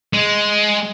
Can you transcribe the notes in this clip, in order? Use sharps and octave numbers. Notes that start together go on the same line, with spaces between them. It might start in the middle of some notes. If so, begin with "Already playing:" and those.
G#3